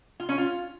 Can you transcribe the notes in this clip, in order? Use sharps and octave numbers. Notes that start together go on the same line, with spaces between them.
F4
C#4
F4